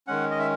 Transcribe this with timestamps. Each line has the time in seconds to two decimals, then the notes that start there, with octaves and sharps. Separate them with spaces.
0.07 D#3 G#3 C#4 F#5
0.31 D#5
0.39 E5